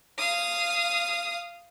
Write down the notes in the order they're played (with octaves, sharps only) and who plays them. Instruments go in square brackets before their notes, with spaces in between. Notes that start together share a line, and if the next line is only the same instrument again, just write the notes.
[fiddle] F5 D#6